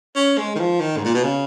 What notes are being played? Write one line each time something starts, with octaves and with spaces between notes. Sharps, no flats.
C#4
G#3
D#3
F3
D#3
G#2
A#2
B2
C#3